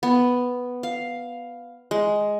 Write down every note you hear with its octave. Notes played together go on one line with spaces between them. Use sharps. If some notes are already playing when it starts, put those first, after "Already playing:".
B3
F5
G#3